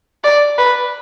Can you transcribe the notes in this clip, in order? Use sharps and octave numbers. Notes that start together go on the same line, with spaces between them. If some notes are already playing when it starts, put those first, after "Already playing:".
D5
B4